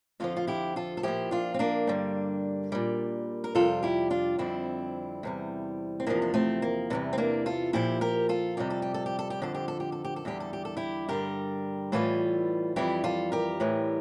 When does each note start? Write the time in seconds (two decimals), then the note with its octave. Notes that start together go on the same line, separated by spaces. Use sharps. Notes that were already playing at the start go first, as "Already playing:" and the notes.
0.20 F2 D3 F3 F4 A4
0.36 F4
0.47 E4 G4
0.76 F4 A4
0.97 A4
1.03 A#2 F3 E4 G4
1.31 D4 F4
1.54 C4
1.59 A#3 D4
1.87 G2 D3 G3
2.72 A#2 G3
3.44 A#4
3.55 F2 C3 G3 F4 A4
3.82 E4 G4
4.10 D4 F4
4.38 F2 D3 G3 C4 E4
5.23 E2 C3 G3
6.00 C4
6.06 E2 C3 F3 A#3 D4
6.22 D4
6.34 A3 C4
6.62 A#3
6.90 E2 C3 E3 G3
7.13 C4
7.18 A#3 D4
7.46 F4 A4
7.73 A#2 F3 E4 G4
8.01 G4 A#4
8.29 F4 A4
8.57 F2 C3 G3 G4
8.70 A4
8.82 G4
8.94 A4
9.06 G4
9.19 A4
9.30 G4
9.42 F2 D3 F3 A4
9.54 G4
9.68 A4
9.80 G4
9.92 A4
10.04 G4
10.16 A4
10.25 E2 D3 G3 G4
10.40 A4
10.53 G4
10.65 A4
10.77 E4 G4
11.08 G2 D3 G3 G4 A#4
11.92 A2 E3 G3 F4 A4
12.76 F2 E3 G3 E4 G4
13.04 F4 A4
13.32 G4 A#4
13.60 A2 E3 G3